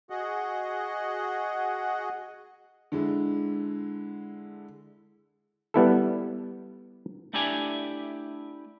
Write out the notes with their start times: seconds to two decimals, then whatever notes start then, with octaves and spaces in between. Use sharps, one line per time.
0.10 F#4 G#4 D#5 F#5
2.92 D3 G#3 E4
5.74 G3 B3 E4 A4
7.33 A3 D4 E4 G4 D5 G#5